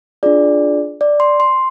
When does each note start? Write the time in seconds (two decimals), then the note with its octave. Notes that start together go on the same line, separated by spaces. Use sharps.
0.23 D4 F4 G#4 D5
1.01 D5
1.20 C6
1.40 C6